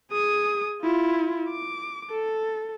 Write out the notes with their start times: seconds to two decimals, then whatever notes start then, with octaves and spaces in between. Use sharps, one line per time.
0.11 G#4 D#6
0.82 E4 F4
1.49 D6
2.11 A4